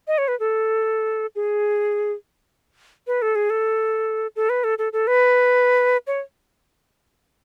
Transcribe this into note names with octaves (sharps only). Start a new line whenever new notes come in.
D#5
C#5
B4
A4
G#4
B4
A4
G#4
A4
A4
B4
A4
A4
A4
B4
C#5